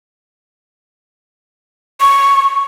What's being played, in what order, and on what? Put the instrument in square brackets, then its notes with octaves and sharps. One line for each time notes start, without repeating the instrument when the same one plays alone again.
[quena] C#6